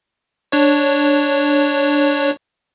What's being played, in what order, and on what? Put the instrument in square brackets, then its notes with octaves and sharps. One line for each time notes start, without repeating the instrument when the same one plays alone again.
[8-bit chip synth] D4 C#5